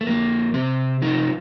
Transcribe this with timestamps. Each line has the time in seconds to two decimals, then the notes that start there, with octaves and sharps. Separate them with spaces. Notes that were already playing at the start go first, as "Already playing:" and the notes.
0.01 A3
0.07 F2 A#3
0.54 C3 C4
1.02 F3 D#4